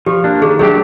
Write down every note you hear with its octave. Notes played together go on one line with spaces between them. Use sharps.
F3 G4
A#3 D4
D#3 G#4
F#3 A3 D4 G4 G#4